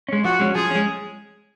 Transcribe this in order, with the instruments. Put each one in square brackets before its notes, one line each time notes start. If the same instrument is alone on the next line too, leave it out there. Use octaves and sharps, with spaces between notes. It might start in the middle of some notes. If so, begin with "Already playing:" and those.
[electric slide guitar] G#3 C#4
[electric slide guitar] F3 [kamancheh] F#4
[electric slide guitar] G#3 C#4
[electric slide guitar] F3 [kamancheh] G#4
[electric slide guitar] G#3 C#4